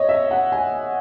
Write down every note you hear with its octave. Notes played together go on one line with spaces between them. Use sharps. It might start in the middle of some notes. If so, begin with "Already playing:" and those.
Already playing: C#5 D#5
E5
F#5
G#5